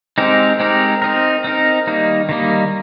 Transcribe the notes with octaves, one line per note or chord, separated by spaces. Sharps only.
G#3 C4 D#4 G4 A#4
G#3 C4 D#4 G4 A#4
C4 D#4 A#4
C4 D#4 A#4
D#3 G3 A#3 D#4
D#3 G3 A#3 D#4